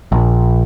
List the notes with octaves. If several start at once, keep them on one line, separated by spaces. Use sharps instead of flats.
A#1